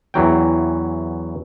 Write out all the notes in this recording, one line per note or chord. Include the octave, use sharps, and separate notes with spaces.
E2 E3 F#3 G5